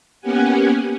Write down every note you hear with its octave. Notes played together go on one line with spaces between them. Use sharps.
A#3 B3 C#4 G4 F#5 G#5